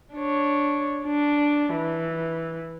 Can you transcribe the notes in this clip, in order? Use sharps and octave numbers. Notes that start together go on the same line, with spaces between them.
D4 C#5
D4
E3